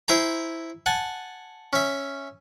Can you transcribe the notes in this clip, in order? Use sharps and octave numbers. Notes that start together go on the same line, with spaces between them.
E4 C5 G#5 A#5
F#5 G#5 A5
C#4 E5